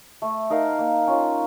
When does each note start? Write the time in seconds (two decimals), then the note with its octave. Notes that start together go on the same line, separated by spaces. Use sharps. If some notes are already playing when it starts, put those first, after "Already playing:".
0.22 A3
0.50 D#4 A#4 F5
0.79 A#3
1.07 C#4 F4